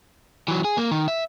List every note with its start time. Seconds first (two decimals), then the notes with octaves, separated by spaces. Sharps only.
0.48 E3 F#3
0.64 G#4
0.77 A#3
0.91 D#3
1.08 E5